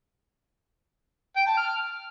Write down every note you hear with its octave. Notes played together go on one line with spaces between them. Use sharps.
G5
A5
F6